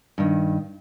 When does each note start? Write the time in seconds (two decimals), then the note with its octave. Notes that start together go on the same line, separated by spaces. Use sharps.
0.18 G2 D#3